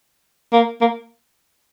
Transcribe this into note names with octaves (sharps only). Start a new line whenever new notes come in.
A#3
A#3